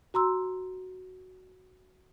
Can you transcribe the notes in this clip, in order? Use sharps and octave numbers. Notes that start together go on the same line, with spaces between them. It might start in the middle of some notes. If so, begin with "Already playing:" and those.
F#4 A#5 C6 E6